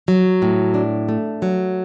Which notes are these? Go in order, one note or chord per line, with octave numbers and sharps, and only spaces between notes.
F#3
A2
D4
A3
F#3